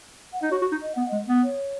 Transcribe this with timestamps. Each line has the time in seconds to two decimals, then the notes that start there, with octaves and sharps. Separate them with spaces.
0.33 F#5
0.42 D#4 D#5
0.51 F#4 C#5
0.61 F#4
0.71 D#4
0.82 D#5
0.95 B3 F#5
1.08 G#3 D#5
1.28 B3
1.43 C#5